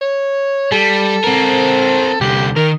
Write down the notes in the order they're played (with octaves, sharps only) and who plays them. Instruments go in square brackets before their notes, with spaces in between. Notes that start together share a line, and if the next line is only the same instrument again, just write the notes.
[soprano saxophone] C#5
[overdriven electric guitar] G3 [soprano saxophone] A4
[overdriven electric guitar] C4 A#4
[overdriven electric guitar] C2 D3 [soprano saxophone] G4
[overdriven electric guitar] D#3 [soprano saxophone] A#4